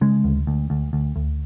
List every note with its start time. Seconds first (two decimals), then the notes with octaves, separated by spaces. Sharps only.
0.01 C#3 G#3
0.24 D2
0.47 D2
0.70 D2
0.93 D2
1.16 D2